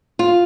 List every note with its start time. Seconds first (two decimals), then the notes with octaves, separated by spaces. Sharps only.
0.19 F4